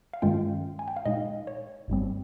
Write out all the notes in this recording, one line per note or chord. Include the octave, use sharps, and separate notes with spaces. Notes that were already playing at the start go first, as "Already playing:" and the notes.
F5
G2 D#3 G#3 C#4 F4 G5
G#5
G5
F5
A#2 G#3 D#4 D#5
C#5
G1 G2 G3 C4